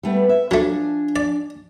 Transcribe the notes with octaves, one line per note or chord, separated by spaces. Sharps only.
G3 A3 B3
E5
F3 F#3 A3 D4 G#5
D5